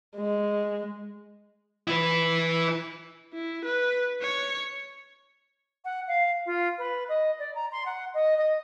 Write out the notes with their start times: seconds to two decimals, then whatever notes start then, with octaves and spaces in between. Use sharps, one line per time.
0.17 G#3
1.87 E4 B4
3.33 E4
3.65 B4
4.22 C#5
5.84 F#5
6.07 F5
6.46 F4
6.78 B4
7.08 D#5
7.39 D5
7.55 A#5
7.71 C6
7.85 F#5
8.13 D#5
8.37 D#5